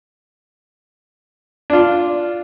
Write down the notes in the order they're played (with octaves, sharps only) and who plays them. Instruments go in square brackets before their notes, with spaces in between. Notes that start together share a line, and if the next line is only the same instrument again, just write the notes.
[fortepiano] D4 F4